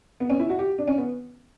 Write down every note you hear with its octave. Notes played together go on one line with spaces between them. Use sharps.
B3
C#4
E4
F#4
G4
D4
C#4
B3